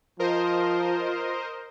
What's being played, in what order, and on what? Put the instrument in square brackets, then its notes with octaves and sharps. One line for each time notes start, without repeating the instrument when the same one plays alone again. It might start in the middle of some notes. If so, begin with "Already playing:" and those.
[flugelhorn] F3 [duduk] F4 [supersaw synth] A#4 C5 D#5